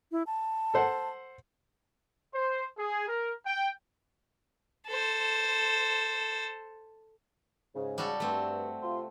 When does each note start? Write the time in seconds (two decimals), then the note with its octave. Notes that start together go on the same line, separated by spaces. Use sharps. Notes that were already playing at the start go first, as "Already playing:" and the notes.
0.12 E4
0.27 A5
0.74 A4 C5 F#5
2.34 C5
2.78 G#4
3.08 A#4
3.46 G5
4.87 A4 C5
7.75 G#2 C#3
7.98 G3 F#4 A4
8.20 G2 A3 C4
8.82 C3 F4 C6